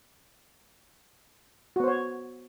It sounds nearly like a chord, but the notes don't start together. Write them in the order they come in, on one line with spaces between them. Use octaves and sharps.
F#4 B3 C5 C#5